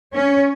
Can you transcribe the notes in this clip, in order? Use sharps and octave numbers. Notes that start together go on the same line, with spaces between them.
C#4